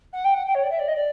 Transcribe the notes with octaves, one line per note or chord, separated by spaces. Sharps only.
F#5
G5
F#5
G5
C#5
D5
E5
D5
D#5
D5